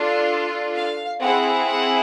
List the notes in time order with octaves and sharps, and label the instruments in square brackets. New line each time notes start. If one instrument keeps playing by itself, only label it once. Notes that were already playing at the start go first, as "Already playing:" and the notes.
Already playing: [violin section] D4 F4 A4
F5
C4 E4 G#4 F#5
F#5